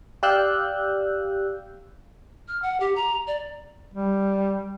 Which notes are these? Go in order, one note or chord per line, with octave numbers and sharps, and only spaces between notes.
G4 D5 F5 E6 F#6 G6
F6
F#5
G4
A#5
D5
G3